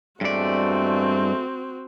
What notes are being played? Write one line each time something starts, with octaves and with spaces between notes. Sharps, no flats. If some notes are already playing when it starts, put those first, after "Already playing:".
E2 G2 G#3 A3 C4 F#4 D5